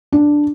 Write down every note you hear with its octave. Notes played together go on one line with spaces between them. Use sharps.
D4